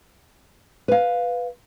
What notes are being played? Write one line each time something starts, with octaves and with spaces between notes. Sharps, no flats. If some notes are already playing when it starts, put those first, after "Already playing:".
B4 F5